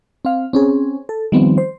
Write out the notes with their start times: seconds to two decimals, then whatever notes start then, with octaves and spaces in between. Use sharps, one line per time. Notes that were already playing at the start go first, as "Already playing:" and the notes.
0.25 C4 F5
0.53 C4 C#4 G#4
1.09 A4
1.32 D#3 F3 G3 B3 C4
1.58 C5